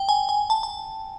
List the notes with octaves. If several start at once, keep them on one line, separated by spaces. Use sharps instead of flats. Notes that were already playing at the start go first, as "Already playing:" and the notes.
Already playing: G5
G#5
G#5
A5
A5